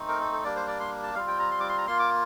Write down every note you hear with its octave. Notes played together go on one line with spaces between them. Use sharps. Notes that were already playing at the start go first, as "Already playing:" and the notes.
Already playing: A3 C4 D#4
A#4
A4
A4
G3 A#3 D4 D5
C5
D5
C6
A5
G3 C4 F4 F5
G5
A#5
C6
D6
C6
A#5
A#3 F4 C6
D6